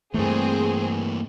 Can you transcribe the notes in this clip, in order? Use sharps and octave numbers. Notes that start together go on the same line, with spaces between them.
G2 E3 A3 A#3 C4 G#4